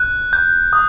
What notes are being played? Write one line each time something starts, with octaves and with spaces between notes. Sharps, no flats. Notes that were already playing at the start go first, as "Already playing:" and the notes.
Already playing: F#6
G6
D#6